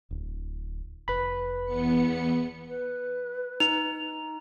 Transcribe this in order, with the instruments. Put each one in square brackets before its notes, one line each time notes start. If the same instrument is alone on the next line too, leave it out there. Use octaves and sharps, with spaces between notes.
[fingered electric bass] D1
[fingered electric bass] F1 [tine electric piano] B4 B5
[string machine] E2 B3 C#7
[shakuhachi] B4
[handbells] D#4 [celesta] F7